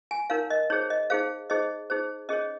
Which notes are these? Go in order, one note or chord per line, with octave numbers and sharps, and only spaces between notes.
G#5
D#4 A#4 C#5 F5
D#5
D#4 G#4 C5 C#5
D#5
D#4 G#4 C5 F5
D#4 G#4 C5 D#5
D#4 G#4 C5
C#4 G#4 C#5 D#5